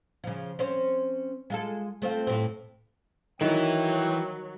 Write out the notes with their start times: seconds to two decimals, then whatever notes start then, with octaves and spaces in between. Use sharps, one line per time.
0.24 C#3 F3
0.59 C4 C#4 C5
1.50 G#3 F4 A4
2.02 A3 C4 F4
2.27 A2 C4
3.41 D#3 E3 F#3 E4 G5